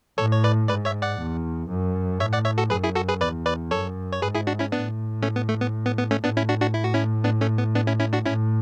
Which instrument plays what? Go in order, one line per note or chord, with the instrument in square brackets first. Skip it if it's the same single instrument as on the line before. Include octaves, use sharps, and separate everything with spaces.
[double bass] A2 [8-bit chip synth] A4 C#5
[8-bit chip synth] C#5
B4 D5
[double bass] G#2 [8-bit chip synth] B4 D5
[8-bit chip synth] C#5 E5
D5 F#5
[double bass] E2
F#2
[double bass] A2 [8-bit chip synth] C#5 E5
[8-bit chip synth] D5 F#5
C#5 E5
F#4 A4
[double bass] F#2 [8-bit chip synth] G#4 B4
[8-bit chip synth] E4 G#4
F#4 A4
G#4 B4
[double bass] E2 [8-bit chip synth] B4 D5
[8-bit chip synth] B4 D5
[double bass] F#2 [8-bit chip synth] A4 C#5
[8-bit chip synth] C#5
[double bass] G#2 [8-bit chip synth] G#4 B4
[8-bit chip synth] E4 G#4
D4 F#4
C#4 E4
[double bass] A2 [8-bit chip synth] B3 D4
[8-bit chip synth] A3 C#4
B3
A3
B3
B3
B3
A3 C#4
[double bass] A2 [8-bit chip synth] B3 D4
[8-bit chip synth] C#4 E4
D4 F#4
D4 F#4
E4
F#4
C#4 E4
B3 D4
A3 C#4
B3
B3 D4
C#4 E4
C#4 E4
D4 F#4
[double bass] A2 [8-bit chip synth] C#4 E4